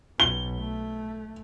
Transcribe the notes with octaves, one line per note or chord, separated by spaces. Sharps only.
B1 G7
A3